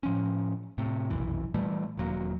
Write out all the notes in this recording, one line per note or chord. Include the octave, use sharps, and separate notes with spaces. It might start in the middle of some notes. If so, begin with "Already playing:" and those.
A2 F3 C#4
A2 C3
F1 B1 F#2 E3
A#2 E3 G3 A3
E1 D#2 F#3 A#3